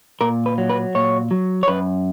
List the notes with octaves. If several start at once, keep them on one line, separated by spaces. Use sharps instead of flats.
A#2 A#4
B4
F#3
B4
A#2 C#5
F#3
C#5
F#2 B4